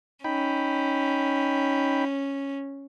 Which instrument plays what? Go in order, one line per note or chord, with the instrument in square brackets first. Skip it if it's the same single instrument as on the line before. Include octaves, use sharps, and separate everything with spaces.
[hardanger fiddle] C#4 [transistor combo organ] D#4 G5 B5